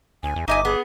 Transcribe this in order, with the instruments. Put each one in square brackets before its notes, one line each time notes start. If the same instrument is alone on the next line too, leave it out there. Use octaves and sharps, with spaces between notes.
[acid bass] D2 [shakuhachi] G#5
[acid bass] E2
[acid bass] G1 [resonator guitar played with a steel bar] D#4 D#5 G#5 [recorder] E5 [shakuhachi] D6
[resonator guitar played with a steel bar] B3 [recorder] G#4